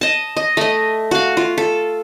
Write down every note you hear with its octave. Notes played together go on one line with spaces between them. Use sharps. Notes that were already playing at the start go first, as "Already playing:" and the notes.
D#5 A5
D#5
A3 D#5
F#4 F5
F4
A4